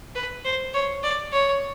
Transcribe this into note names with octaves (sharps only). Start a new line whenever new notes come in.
B4
C5
C#5
D5
C#5